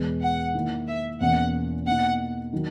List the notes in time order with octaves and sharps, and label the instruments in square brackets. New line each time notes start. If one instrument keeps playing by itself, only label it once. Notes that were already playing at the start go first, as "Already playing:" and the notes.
Already playing: [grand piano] E2 B2 G#3 B3
[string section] F#5
[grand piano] D#3 A#3 E4
[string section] E5
[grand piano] E2 B2 A#3 C#4 [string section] F#5
[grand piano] B2 A#3 D#4 [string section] F#5
[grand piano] D#3 F#3